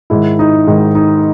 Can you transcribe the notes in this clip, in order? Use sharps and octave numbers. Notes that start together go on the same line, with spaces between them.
G#2 D#3 E4
D#4
G#2 D#3
D#4